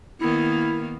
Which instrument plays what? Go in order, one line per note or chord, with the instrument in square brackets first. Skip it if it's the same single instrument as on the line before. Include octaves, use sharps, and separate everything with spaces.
[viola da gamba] D#3 A#3 B3 [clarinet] E4